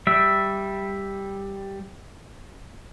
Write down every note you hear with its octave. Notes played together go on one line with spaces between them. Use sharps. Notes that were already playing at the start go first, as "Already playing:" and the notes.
G3 E5